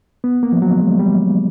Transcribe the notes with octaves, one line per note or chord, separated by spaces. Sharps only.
B3
A#3
F3
F#3
G#3
G3